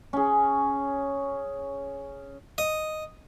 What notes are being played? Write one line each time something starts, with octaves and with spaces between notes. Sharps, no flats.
C#4 G#4
D#5